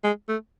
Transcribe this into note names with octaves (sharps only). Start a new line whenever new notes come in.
G#3
A3